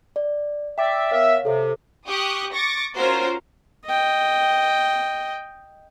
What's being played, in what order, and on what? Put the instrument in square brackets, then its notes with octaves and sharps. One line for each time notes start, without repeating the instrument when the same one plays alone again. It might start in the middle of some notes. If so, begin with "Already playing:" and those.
[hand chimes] D5
[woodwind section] D5 E5 [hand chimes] G5 D6
[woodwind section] B3 A#4 E5 [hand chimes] C#5 F5
[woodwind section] C3 [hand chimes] A4 C5
[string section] G4 C#6 D#6 F#6
C#6 D6 A6 A#6
C#4 F4 F#4 A#4 C5
[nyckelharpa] D#5 G5